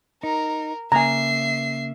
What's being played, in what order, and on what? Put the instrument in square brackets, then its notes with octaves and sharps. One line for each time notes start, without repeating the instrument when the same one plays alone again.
[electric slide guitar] D#4 [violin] A#4
[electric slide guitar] C#3 A#3 [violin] E5 C7 [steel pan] G#5 A#5